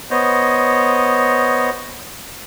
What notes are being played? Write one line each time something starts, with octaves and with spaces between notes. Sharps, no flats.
B3 C5 C#5 D#5